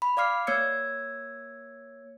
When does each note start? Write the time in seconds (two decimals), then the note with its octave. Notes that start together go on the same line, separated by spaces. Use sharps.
0.02 B5
0.17 D5 F5 D6 F6 C7
0.47 A#3 C#5 E6 G#6 C#7